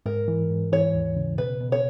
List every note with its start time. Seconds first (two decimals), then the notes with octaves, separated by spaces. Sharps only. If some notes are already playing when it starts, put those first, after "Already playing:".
0.06 G#2 A#4
0.28 E3
0.50 G#2
0.72 E3 C#5
0.94 D#2
1.17 C#3
1.38 B2 B4
1.61 B2
1.72 C#5